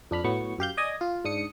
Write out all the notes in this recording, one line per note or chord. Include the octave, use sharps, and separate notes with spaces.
F2 D4 B5 F6
A2 F#3 B3 C#6
F#2 G4 F5 G6
D5 D#5 G#5 D#6
F4
G#2 D4 D#6 C#7